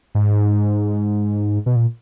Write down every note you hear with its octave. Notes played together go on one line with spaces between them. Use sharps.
G#2
B2
A#2